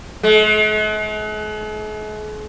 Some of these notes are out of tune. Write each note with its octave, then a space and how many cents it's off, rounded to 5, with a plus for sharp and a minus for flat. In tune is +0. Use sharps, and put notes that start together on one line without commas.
G#3 +45